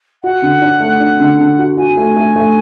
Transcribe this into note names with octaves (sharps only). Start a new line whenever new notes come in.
F#4 F#5
D3
D4
A3
D4
D3
D3
F#4
F#4 G#5
A3
A3
A3